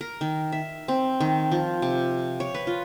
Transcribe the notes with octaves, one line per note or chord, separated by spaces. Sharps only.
A#4
D#3
E5
C4
D#3
F3
C3
C#5
B4
F4